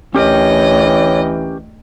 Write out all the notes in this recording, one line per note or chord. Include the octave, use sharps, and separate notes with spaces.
D2 E3 C#4 G4 A#4 C#5 D#5 G5